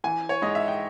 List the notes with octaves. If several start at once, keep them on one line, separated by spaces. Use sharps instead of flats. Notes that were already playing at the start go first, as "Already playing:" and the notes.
E3 G#5
C#5
G#2 D#5
E5
G5